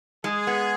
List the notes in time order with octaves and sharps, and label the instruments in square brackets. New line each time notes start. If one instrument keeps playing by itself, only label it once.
[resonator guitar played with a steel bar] G#3 [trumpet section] G#4
[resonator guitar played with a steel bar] B3